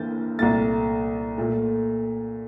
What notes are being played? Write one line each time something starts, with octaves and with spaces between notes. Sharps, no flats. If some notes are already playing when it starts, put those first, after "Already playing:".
Already playing: G2 E3 A#3 G6 A6
C2 A#2 A3 A6
A#2 A3